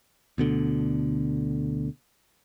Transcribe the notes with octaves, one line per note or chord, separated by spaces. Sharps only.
D2 B2 D3